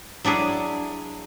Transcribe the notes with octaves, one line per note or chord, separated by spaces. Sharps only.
F#3 D4 E4 G#4